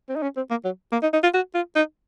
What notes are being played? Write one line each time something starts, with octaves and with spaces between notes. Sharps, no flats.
C4
D#4
C#4
C4
A#3
F#3
A#3
D#4
D#4
F4
F#4
F4
D#4